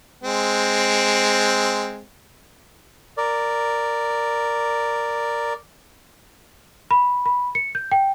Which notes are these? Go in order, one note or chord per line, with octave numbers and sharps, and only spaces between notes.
G#3 C4
A#4 D5
B5
B5
C#7
G6
G5